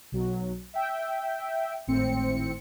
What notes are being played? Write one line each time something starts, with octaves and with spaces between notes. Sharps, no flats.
B1 F#3
E5 G5
G#1 A2 C4 C#7